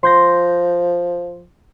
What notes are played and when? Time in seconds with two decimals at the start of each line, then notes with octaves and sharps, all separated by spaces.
0.03 F3 C6 G6 A#6